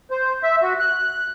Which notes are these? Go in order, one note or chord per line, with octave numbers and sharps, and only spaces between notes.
C5
E5
F#4
F#6